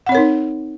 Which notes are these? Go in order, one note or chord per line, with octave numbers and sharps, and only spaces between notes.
C4 D#4 A#4 C#5 F#5